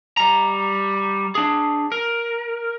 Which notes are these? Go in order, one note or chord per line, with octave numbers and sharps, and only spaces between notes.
G3 A#5
D4 G#4
A#4